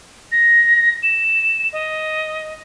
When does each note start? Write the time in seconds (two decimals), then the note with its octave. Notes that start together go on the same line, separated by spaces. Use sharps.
0.32 A#6
1.03 E7
1.73 D#5